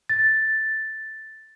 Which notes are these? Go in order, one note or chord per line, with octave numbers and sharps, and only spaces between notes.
A6